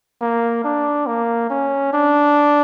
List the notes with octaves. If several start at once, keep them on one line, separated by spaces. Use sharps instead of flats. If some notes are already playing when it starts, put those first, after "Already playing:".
A#3
D4
A#3
C#4
D4